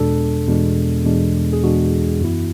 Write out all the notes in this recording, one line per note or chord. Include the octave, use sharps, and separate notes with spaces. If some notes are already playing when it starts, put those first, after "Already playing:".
Already playing: E2 B2 G#3 D4 A4
E2 B2 G#3 D4
E2 B2 G#3 D4
G#4
E2 B2 G#3 D4 F#4
F#2 E3 B3 E4